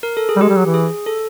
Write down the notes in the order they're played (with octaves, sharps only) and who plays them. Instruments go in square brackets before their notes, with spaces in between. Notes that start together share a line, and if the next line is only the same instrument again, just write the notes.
[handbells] A#4
A4
G#4
[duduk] G3
[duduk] G#3 [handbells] G4
[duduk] G3
F#3
E3
[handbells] G#4
A4